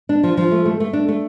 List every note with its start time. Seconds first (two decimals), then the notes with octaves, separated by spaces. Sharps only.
0.09 D4
0.23 F3
0.37 F3
0.52 A3
0.65 A3
0.80 A3
0.93 D4
1.08 A3